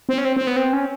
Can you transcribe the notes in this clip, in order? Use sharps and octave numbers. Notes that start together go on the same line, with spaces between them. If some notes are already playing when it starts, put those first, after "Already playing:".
C4
C#4
C4
C4
B3
C4
C#4